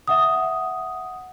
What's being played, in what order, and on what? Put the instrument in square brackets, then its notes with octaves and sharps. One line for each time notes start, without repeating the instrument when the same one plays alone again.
[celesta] E5 F#5 D#6